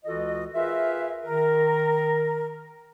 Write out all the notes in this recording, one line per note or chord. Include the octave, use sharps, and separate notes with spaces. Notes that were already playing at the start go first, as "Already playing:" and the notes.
C#2 E3 F4 F#4 A4 D#5
F4 G#4 A#4 B4 E5
D#3 A#4